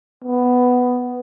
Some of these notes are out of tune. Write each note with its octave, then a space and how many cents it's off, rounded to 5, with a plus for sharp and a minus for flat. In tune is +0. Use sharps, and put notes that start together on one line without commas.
B3 +5